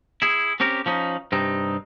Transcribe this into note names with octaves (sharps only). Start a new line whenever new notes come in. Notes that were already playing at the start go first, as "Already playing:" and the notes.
E4 G#4
C4 C#4 G4 A#4
F3 C#4 D#4
G2 C3 C4 D#4